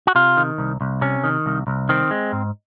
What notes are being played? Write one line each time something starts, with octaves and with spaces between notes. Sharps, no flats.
F#4
C3 F4
D#3
C2
C2
C3 C#4
D#3
C2
C2
D#3 C4
G#3
G#2